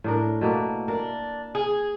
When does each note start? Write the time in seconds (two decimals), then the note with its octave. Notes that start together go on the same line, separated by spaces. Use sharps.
0.04 A2 D4 A#4
0.41 B2 A3 A#3
0.88 D4 A#4
1.55 G#4